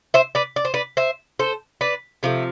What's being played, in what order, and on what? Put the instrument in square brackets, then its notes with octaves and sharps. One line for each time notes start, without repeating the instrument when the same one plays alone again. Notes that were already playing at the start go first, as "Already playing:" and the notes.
[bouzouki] C5 E5
B4 D5
D5
C5
B4 D5
C5 E5
A4 C5
B4 D5
C3 F3 A3